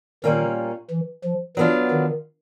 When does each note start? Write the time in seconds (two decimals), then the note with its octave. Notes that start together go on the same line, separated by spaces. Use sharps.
0.24 A#2 D#3 G3 A#3 C#4
0.91 E3
1.24 F3
1.57 E3 F#3 B3 D4 F4
1.91 D#3